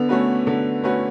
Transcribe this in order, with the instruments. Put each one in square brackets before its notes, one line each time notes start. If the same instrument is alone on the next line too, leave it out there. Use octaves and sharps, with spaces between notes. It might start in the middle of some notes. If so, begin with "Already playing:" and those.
Already playing: [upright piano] D3 [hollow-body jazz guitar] B3
[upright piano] A3 C#4 F#4 B4
D3
A3 C#4 F#4 B4